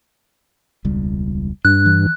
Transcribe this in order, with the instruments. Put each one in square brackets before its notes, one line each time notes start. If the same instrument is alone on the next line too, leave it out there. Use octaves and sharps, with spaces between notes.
[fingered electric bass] E1 C#2 G3
[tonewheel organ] G2 [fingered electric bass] D4 [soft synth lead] F#6
[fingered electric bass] E3